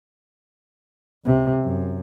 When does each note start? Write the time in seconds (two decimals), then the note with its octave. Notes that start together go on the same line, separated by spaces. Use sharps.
1.24 C#2 C3
1.60 F#2